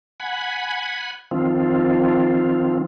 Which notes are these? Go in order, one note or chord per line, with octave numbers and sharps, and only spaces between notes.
F#5 G#5 B5
D#3 F3 C4 F4